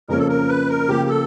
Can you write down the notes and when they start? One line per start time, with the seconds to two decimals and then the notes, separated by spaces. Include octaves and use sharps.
0.08 F2 C#3 F3 A#3 C#4 A#4
0.18 A4
0.29 A#4
0.49 B4
0.69 A#4
0.89 C#3 F3 A#3 G4
1.09 A4